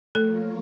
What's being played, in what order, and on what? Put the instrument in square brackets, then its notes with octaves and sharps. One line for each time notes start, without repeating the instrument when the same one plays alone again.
[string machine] F3 A#3 F4 A#4 C#5 [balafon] A3 A4